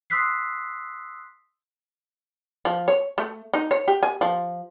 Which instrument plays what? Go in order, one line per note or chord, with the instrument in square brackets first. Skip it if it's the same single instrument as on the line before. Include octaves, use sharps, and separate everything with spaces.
[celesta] C6 D#6 E6 F#6 B6 C7
[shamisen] F3
C#5
A3
D#4
C#5
G4
G#5
F3